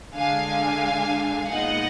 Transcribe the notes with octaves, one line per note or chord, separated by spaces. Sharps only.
D3 G#3 D4 F5 G#5
A#2 G#3 B3 D#4 D#5 F#5